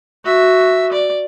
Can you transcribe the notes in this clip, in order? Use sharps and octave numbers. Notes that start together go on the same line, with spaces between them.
F#4 E5
D5